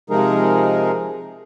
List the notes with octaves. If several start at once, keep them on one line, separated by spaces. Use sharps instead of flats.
C3 F3 G#3 D#4 G#4 A#4